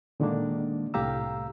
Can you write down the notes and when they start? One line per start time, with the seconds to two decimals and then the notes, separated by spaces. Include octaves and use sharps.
0.20 A#2 D3 D#3 G#3 A#3 D4
0.94 C2 A2 G4 F5 A#5 E6